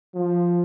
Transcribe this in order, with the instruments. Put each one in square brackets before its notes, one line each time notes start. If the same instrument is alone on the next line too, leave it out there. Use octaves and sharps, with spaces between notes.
[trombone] F3